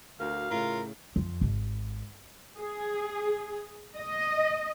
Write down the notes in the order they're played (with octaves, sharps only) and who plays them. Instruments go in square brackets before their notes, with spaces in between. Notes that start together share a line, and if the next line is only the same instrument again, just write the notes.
[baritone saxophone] D2 [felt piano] F#4 A#4 [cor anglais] F5
[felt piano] A2 C#3 [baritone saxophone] F4 [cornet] A#4
[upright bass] F2
G#1
[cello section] G#4
D#5